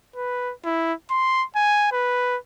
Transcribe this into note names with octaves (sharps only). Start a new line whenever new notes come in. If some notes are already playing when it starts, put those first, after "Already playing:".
B4
E4
C6
G#5
B4